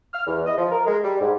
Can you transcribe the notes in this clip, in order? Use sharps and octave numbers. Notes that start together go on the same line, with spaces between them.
F6
E2
D#5
F3
A#4
G#3
G3
G#2